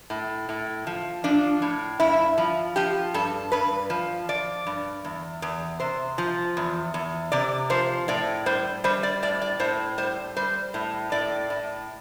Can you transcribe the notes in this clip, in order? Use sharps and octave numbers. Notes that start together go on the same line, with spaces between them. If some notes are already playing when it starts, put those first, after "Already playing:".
A2
A2
F3
F3 D4
A2
G2 E4
F3
F3 G4
G2 A4
G2 B4
F3
F3 D5
G2
E2
E2
C3 C5
F3
E2
E2
C3 D5
F3 C5
A2 D5
G3 C5
G3 C5
D5
A2 D5
D5
A2 C5
G3 C5
G3 C5
A2
A2 D5
A2